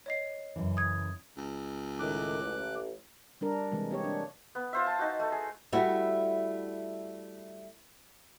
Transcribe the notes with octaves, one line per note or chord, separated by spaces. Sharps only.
C#5 D#5 C7
F#2 C#3 E3
D#6 G#6
C#2
A2 D#3 D6 F#6
A1
G3 D4 A#4
C3 E3 G#3
A#3 G4 C#5
D4
B3
F4 C5 E5
A5
D#4 F#4
A3
G#4
G3 A3 E4 F#4